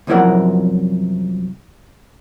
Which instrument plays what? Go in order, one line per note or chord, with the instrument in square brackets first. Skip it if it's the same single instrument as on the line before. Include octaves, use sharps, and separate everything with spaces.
[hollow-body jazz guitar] C2 F#2 F3 E4 A#4 F#5